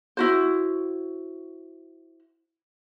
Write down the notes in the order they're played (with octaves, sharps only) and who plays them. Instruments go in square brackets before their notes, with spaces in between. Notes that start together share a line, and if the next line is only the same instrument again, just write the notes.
[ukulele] E4 F#4 C5